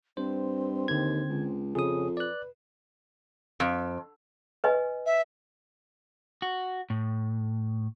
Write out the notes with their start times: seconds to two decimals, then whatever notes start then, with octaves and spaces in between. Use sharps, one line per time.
0.17 G2 C4 C5
0.88 D#2 D3 G#6
1.30 C#2
1.75 F2 C#3 G#4 D#6
2.17 B4 D5 F#6
3.60 F2
4.64 B4 D#5 G#5
5.06 E5
6.42 F#4
6.90 A2